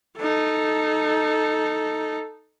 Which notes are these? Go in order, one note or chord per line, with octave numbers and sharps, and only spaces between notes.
D#4 A4